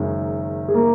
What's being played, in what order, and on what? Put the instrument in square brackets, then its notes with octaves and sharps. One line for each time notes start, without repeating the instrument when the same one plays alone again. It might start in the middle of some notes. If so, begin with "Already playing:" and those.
Already playing: [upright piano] F#1 F#2 D#3 G#3
[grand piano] G#4
A#3 A#4